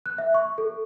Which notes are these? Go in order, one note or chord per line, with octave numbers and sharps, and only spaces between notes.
F#6
E5
C#6
A4